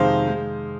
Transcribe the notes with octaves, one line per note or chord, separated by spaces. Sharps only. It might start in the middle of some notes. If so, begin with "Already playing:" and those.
Already playing: F2 C3 D#3 G#3 C5 F5
G#3